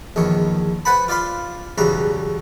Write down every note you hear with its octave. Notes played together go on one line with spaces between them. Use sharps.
A#1 E2 D#3 C#5
B4 C5 F#5 G#5 A5 B5
F4 D5 F5 B5 C6
B1 E2 C#3 G3 F#4 A#5